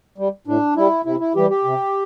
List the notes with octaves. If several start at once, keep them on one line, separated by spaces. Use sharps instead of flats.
G3
A2 D4
G3 E4
C3 E4
E4
E3 G3 G4
G4
C3